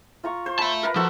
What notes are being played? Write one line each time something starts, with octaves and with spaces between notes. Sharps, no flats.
F4 A#5 C#6
C5
E5 A5 B5
A#4 B4 A#5
F3 F#4 A4 C5